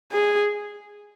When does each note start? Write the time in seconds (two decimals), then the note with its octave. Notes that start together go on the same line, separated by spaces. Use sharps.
0.12 G#4